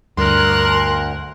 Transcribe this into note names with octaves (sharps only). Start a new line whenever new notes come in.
D2 G2 A#4 C6 F#6